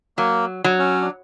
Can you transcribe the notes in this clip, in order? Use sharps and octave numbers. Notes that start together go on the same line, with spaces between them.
F#3 A#3
F#3
C#4
D4